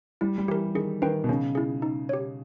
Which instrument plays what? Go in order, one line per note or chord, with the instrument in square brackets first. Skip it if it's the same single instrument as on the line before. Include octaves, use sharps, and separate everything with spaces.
[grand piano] G3 [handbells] E4
[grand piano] G3
[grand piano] E3 [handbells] G4 A#4
[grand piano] D#3 [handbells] G#4
[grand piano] D#3 [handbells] B4 G5
[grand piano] B2
[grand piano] C#3 [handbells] C#4
[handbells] E4 G#4
D#4
G4 C#5